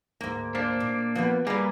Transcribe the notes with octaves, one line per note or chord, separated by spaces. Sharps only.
D2 G#2 A#3
A#3 D4 C5
A#2
F3 B3 F#4 B4
G3 A#3 G#4 A4 B4